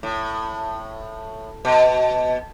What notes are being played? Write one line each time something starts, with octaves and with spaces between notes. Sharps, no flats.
A2
B2